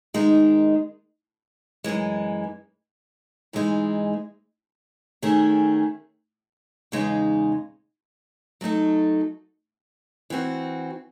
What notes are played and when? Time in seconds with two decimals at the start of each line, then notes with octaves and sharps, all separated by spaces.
0.14 D#3 G#3 D#4
1.84 F#2 E3 G#3
3.53 G#2 E3 G#3 D#4
5.22 D#3 A3 C#4 G#4
6.92 E2 C#3 G#3 D#4
8.61 F#3 A3 D#4 A4
10.30 E3 C4 F#4